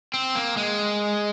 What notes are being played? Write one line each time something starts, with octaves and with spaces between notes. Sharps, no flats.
C4
A#3
G#3